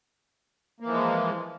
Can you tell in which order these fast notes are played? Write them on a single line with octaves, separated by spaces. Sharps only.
A#3 E3 F3 G#3